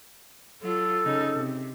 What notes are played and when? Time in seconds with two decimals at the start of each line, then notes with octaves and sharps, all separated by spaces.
0.62 F#3 F4 A4
1.05 C#3 D#4
1.36 C3